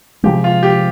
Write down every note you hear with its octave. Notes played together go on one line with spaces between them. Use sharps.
C3 F3 G#3 G4
F4
G4